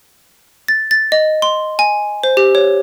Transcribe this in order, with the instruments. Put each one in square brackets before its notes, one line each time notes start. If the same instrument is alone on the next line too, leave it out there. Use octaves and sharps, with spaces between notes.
[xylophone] A6
A6
D#5
C6
G#5
C5
G4
C#5